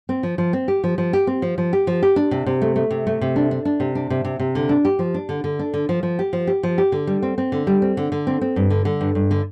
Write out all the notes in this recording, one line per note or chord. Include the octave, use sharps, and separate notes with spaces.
C4
F3
F3
C4
G4
F3
F3
G4
C4
F3
F3
G4
F3
G4
D4
C3
C3
A3
A3
C3
A3
C3
D4
D4
D4
C3
D4
C3
C3
C3
D3
D4
G4
F3
D4
D3
D3
D4
D3
F3
F3
G4
F3
G4
F3
G4
D3
G3
C4
C4
D3
G3
C4
D3
D3
C4
C4
G2
D3
D3
G2
G2
D3